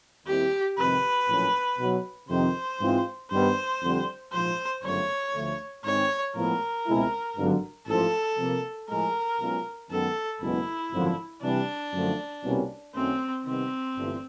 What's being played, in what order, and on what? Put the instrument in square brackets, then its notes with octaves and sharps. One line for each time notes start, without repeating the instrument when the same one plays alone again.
[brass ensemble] D#2 D#3 G3 C4 E4 [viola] G4
[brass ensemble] F2 C3 D#3 G#3 [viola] B4
[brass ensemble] A#1 A2 F#3 A#3 C#4
B1 B2 F#3
[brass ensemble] F2 C3 D#3 [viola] C5
[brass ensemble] G#2 E3 G#3 C4 F4
[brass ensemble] G2 D#3 G3 B3 D#4 [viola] C5
[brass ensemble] F2 D3 G3
[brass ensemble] A#1 G#2 F3 [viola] C5
[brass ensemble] G1 F#2 C#3 F#3 A3 [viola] C#5
[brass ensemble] D2 D3 F3 A3
[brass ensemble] G#2 D#3 G#3 C4 D#4 [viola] C#5
[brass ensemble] A2 F3 G#3 B3 [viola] A#4
[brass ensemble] C#2 B2 G#3 C4 E4
G#1 G2 D3 F#3
[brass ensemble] A1 G#2 F3 A3 [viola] A4
[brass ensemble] C3 F3 A#3
[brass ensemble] A2 F3 G#3 [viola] A#4
[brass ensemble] B1 B2 G#3 C#4 F4
[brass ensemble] F#2 D#3 G#3 B3 [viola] A4
[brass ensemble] F#1 E2 B2 G#3 B3 [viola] E4
[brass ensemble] G#1 F#2 D3 F3
[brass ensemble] C3 E3 G3 [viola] D4
[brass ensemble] F#2 D3 F3 A3
C2 B2 G3 A#3 C#4
[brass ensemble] F#2 D#3 F#3 A3 C#4 [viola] C4
[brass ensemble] C3 D#3 G3 B3 D#4 [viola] C4
[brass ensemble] G1 G2 E3 A3 D4